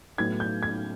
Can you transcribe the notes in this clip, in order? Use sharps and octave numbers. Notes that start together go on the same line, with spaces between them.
A2 F#3 B3 G#6
G6
G#6